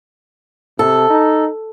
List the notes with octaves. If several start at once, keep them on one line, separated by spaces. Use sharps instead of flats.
C3 A4
D#4